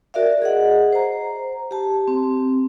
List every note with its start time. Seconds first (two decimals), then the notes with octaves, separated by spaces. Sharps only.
0.14 F#4 A#4 D5 E5 F5
0.42 G#4 D#5 F#5
0.92 C5 A#5
1.71 G4 A5
2.08 C4